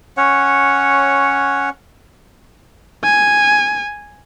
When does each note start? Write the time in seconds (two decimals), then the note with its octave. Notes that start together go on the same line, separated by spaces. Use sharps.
0.17 C#4 C#5 F#5
3.04 G#5